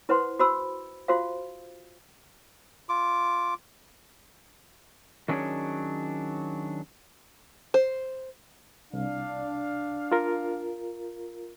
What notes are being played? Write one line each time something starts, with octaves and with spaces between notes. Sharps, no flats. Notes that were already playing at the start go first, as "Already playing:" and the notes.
E4 B4 C5 F#5 C6
F#4 C5 B5 E6
F4 F#4 C5 F5
F4 D6
D#3 F#3 C#4 D4 G#4 C#5
C5
C2 D4 F5
F4 A#4